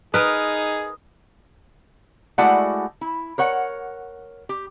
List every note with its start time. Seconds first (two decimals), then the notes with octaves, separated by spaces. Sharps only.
0.14 D#4 G#4 A#4 B4 D#6
2.38 G#3 A3 E4 F#4 D5 F#5
3.01 E4
3.38 A#4 C#5 F#5
4.49 G4